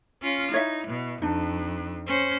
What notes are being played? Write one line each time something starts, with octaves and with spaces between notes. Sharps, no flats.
C#4 F4
D#4 E4 C#5 E5
B2
F2 D4 D#4
C#4 C5